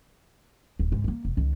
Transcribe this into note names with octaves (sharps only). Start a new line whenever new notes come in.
D1
D2 G#2
G#3 A#3
E1
C#2 D#3